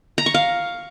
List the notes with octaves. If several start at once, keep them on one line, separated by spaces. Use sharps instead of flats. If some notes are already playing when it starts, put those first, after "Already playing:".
A#5
C#6
F5